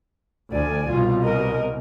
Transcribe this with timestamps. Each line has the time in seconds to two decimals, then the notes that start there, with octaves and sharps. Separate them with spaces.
0.52 D2 D5 G#5
0.90 C2 B2 F4
1.23 A#4 D#5